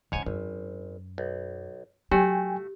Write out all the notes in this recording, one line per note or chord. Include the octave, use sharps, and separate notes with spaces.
E2 G#2 C#3 C#5 G#5
G#1 F#2
B1
F#3 A3 F#4 G4 G5 G#5